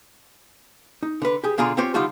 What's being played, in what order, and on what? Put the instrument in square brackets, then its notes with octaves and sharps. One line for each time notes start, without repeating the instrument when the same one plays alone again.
[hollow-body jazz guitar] D#4
D3 B4
G4 G#4
B2 D3 D4 F4 G#4 A#5
C4 F4 G4 C5 C#5
D3 G3 D#4 F4 F#4 A4